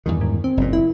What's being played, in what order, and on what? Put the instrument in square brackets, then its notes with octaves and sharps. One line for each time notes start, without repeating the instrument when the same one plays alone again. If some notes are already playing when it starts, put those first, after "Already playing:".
[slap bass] E2 G2 D#3
[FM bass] G#2
C4
[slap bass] F#1 A#2
[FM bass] E4